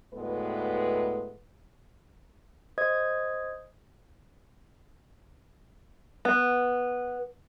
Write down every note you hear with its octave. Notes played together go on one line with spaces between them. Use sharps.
D2 A2 G#3 B3 A4 B4
C5 D#5 D#6 G#6
B3